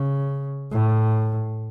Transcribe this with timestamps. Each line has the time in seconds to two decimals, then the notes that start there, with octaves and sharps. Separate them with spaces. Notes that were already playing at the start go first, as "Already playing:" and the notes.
Already playing: C#3
0.71 A2